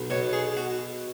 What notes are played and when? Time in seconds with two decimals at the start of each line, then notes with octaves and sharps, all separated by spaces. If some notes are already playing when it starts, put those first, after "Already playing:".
Already playing: B1
0.10 B2 C#5
0.33 G#4
0.57 F#4